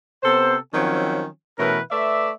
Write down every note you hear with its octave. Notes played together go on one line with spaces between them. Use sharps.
C3 B3 A4 C5
D#3 F3 F#3 C4 C#4
B2 E3 A3 C#4 A#4 B4
A3 B4 D5 E5